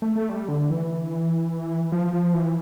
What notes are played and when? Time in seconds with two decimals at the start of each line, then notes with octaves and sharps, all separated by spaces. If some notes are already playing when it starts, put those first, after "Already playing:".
0.02 A3
0.15 A3
0.29 G3
0.49 D3
0.70 E3
1.92 F3
2.13 F3
2.34 E3